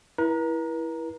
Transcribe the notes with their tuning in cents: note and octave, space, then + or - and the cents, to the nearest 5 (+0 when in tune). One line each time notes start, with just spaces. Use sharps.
E4 +0 B4 -45 A#5 +0